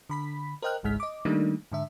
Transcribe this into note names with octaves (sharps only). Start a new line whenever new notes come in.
D3 B5 B6
A#4 C5 D#5 G5 F6 F#6
G#1 C#2 G#2 G#3 F6 B6
D#5 D6
D#3 G3 A3 A#3 D4 D#4
G#2 D3 E5